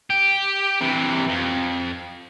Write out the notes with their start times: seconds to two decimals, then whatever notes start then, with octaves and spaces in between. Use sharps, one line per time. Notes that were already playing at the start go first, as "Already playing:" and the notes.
0.10 G4
0.81 C3 E3
1.29 F2